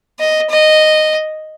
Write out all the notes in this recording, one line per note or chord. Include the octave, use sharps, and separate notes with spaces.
D#5
D#5